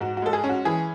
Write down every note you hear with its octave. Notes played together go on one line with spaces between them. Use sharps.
G#2 F#4
F#4
G#3 A4
G#4
C#4
F#4
E3 G#4